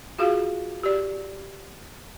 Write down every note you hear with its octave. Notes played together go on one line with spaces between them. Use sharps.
F4 F#4 G#4 F5
G4 D5